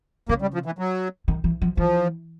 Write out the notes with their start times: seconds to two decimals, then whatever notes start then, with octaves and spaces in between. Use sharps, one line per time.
0.29 C#3 A#3
0.42 G3
0.54 F3
0.66 E3
0.79 F#3
1.28 D#3
1.44 E3
1.62 F3
1.77 E3 F3